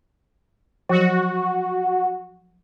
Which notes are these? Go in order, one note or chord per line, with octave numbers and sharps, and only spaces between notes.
F3 F#3 F#4